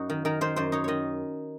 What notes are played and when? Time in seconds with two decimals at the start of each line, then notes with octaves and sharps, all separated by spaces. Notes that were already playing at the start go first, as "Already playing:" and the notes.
Already playing: F#2 D#4 F#4
0.10 D#3
0.25 D#3 A#4
0.41 D#3 C5
0.56 F#2 C5
0.72 D#4 C#5
0.84 D#3 C#5 D#5